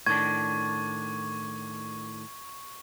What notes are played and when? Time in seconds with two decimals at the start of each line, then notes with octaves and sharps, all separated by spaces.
0.06 A2 D#3 D4 C#6 G#6